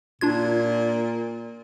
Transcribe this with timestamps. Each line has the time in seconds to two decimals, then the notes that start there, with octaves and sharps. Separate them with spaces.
0.21 A#2 D4 F4 G#6